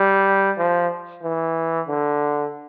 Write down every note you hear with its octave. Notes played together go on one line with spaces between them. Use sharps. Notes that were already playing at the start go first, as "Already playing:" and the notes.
Already playing: G3
F3
E3
D3